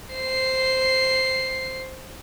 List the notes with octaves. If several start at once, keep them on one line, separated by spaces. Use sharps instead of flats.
C5 C7